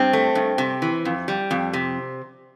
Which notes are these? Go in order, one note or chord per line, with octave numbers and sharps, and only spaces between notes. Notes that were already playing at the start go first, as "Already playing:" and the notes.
Already playing: G2 C4
A3
G2
C3
E3
F2
G3
F2
C3